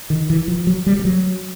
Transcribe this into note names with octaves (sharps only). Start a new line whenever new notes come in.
D#3
E3
F3
F#3
G3
G3
F#3